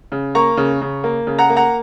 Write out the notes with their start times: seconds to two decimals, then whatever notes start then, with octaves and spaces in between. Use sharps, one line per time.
0.12 C#3
0.35 A#3 A#5 C#6
0.57 C#3
0.81 C#3
1.04 A#3
1.27 C#3
1.39 F#5 A#5
1.50 A#3
1.56 F#5 A#5